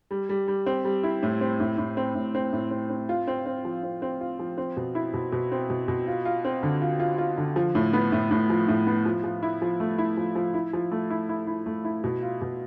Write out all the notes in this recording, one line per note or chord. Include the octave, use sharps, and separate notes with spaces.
G3
G3
G3
C4
G3
E4
A2
C4
A2
A2
C4
A2
C4
A2
C4
C4
F4
C4
C4
F3
C4
C4
F4
F3
C4
B2
E4
B2
B2
C4
B2
B2
F4
F4
C4
D3
F4
F4
F4
D3
F3
A2
B3
A2
A2
F3
A2
B3
F3
F3
E4
F3
A3
E4
F3
F3
E4
F3
A3
E4
E4
E4
A3
E4
B2
F4
B2